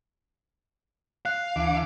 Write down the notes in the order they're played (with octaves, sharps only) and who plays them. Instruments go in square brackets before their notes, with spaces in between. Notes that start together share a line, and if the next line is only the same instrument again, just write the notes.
[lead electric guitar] F5 [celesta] F#6
[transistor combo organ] D2 E3 D6